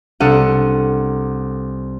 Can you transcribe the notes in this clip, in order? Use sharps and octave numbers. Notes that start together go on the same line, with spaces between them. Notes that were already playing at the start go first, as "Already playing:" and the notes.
C2 D4 A4 F#5 F6 D#7